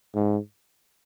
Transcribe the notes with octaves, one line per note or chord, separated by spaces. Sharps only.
G#2